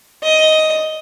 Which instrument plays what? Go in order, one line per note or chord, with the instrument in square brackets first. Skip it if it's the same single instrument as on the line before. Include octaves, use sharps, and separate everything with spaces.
[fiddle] D#5